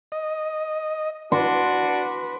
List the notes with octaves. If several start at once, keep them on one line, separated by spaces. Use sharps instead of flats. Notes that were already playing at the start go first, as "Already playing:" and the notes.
D#5
D4 F#4 B4 C6